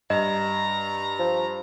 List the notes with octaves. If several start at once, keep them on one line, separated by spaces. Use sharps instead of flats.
G2 D#5 A#5
F3